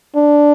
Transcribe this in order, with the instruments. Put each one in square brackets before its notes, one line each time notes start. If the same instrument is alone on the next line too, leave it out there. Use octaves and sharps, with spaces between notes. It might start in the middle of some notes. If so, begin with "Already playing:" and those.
[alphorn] D4